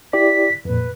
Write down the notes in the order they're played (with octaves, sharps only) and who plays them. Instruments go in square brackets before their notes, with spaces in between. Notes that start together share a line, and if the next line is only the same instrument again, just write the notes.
[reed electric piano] E4 G4 D5 [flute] B6
[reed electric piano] F2 A#2 [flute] B4